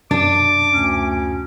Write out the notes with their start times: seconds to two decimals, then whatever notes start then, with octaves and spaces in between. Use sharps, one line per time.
0.11 F#2 B2 D4 D6 A6
0.72 D2 C#4